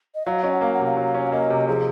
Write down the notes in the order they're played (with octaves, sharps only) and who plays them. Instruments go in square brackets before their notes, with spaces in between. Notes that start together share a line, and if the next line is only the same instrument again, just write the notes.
[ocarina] D#5
[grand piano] F#3 [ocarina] F5
[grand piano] C#4 [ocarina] D#5
[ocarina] F#5
[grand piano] A#3 [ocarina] F5
[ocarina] F#5
[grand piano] C3
[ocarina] F5
[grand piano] F#3
C#4
[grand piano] A#3 [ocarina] D#5
[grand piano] C3
[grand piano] F3 [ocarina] G#4